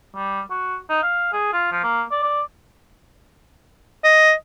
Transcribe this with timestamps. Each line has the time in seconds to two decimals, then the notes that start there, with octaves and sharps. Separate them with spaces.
0.16 G3
0.50 F#4
0.89 D#4
1.02 F5
1.32 G#4
1.52 F4
1.71 F3
1.83 A#3
2.11 D5
2.23 D5
4.04 D#5